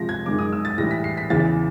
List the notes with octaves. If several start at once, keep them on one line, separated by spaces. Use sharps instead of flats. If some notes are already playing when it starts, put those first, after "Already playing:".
Already playing: C3 F3 G#3 A#6
G#6
F#2 D#3 G#3 D6
D#6
E6
A6
A2 E3 G3 A#6
B6
C7
B6
E2 C#3 E3 A6